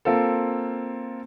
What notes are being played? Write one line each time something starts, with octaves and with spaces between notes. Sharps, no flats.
A#3 C4 F4 A4